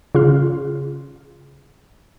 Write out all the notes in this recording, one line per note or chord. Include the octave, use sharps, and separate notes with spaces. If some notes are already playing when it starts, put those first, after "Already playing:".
C#3 F4 C6 F6